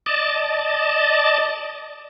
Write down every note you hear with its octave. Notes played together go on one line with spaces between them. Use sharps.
D5 D#5 A5